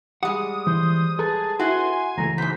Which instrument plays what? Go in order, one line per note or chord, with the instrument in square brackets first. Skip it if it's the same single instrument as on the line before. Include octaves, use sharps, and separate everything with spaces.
[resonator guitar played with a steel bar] G3 G#3 [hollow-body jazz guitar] F#5 [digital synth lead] D#6
[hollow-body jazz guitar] E3 [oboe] C5
[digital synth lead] G#4 [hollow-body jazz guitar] A4 B4 A#5 [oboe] A5
[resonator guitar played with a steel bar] E4 F#4 [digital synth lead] G#5 [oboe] C6
[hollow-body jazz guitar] C#2 E3 A3 [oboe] A#5
[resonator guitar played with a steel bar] G#2 B2 [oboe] C5 [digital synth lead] B6